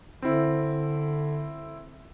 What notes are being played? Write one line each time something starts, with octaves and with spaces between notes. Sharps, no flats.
D3 C4 E4